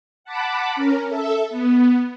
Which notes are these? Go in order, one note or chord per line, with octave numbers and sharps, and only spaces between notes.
F#5 A5 B5 D6
C#4 A#4
A4 E5
B3